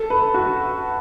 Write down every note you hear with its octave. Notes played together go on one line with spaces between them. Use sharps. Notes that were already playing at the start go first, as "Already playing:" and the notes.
Already playing: A4
B4
F#4